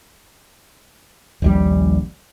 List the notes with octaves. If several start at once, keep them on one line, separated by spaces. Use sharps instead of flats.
D#1 A#1 G3